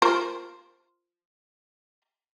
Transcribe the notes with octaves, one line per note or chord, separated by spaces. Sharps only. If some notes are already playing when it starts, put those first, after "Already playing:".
F4 A#4 C5